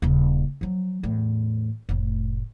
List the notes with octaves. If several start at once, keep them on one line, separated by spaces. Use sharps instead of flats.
D#1 C#3
F3 F#3
E2 A2
F1 A2